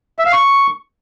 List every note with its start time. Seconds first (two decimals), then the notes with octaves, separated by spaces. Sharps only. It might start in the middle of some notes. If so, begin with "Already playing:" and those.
0.19 E5
0.26 F5
0.33 C#6